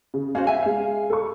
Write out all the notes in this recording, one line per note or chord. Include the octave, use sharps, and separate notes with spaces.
C#3
C#4 F#4 C5 F5
E5 F#5 G#5
G#3 F5
A4 C#6